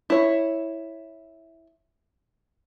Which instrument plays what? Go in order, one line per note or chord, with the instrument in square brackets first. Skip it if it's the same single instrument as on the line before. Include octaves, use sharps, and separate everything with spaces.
[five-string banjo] E4 C#5